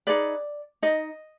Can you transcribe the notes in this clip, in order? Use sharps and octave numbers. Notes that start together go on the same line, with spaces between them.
D#4 G#4 B4 D5
D#4 D#5